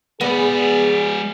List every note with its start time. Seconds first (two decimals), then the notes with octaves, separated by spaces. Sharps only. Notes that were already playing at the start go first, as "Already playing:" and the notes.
0.21 G#3 B3 G#4 D5